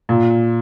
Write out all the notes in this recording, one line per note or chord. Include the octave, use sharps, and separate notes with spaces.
A#2